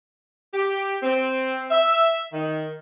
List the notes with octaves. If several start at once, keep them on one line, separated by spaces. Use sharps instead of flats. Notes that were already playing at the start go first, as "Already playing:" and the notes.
G4
C4
E5
D#3